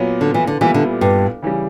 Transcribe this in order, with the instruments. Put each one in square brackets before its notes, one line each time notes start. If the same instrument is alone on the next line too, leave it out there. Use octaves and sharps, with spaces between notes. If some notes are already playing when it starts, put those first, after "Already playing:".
Already playing: [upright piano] A#2 F#3 B3
[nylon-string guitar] D3
E3
D3
[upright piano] A#2 G3 B3 E4 [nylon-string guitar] E3
[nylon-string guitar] D3
G2
[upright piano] C#3 E3 G3